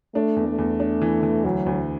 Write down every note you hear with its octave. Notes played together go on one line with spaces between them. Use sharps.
A3 D4
E2
A3
E2
D4
E3
E3
D2 F#3
D2